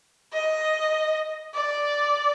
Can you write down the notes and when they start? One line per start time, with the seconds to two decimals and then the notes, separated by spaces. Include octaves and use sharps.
0.33 D#5
1.54 D5